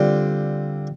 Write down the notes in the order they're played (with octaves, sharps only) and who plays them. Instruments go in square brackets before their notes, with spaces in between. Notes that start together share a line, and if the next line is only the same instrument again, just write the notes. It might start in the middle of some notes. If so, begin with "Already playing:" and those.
Already playing: [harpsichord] D3 G3 C4 F4